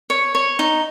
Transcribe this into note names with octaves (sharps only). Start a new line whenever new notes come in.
C#5
C#5
D#4